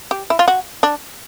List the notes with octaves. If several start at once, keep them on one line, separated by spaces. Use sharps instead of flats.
G4
E4
F4
F#4
D4